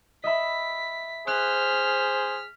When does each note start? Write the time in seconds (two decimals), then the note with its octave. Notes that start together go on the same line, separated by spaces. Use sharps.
0.24 D#5 E5 B5 B6
1.27 G#4 C5 F6 F#6 B6